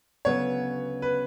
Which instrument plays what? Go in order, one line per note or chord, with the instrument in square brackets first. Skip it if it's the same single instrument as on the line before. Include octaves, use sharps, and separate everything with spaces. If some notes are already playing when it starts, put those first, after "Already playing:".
[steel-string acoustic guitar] D2 C#3 F#3 B3 [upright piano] C#5
[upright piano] B4